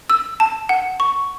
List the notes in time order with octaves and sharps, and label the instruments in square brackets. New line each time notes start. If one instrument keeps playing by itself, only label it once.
[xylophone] E6
A5
F#5
C#6